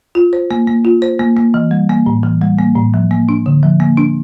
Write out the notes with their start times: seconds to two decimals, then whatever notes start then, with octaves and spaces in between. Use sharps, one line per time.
0.15 F4
0.33 C5
0.51 A#3
0.67 A#3
0.85 F4
1.02 C5
1.19 A#3
1.37 A#3
1.54 E3
1.71 G3
1.90 A#3
2.06 A2
2.23 E3
2.42 G3
2.59 A#3
2.76 A2
2.94 F3
3.11 A#3
3.29 D4
3.46 D3
3.63 F3
3.80 A#3
3.97 D4